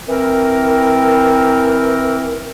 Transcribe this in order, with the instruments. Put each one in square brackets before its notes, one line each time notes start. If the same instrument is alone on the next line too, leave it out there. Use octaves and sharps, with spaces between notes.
[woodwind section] E3 C4 A#4